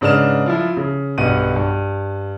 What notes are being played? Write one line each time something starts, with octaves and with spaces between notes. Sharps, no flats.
G#2 C#3 D4 B4 F6 E7
F3 E4 F4
C#3
B1 G2 B3 F#5 D#7
G2